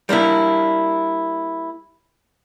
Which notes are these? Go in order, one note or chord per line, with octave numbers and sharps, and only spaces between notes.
G3 A#3 D4 E4